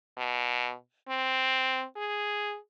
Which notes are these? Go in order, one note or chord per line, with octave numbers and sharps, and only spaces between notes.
B2
C4
G#4